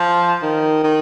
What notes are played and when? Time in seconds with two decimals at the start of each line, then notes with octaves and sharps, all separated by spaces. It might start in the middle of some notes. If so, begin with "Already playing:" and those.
Already playing: F3
0.42 D#3
0.84 D#3